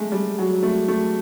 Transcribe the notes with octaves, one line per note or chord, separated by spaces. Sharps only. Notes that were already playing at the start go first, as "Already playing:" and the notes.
Already playing: G#3 A3
G3
F#3
A3
A3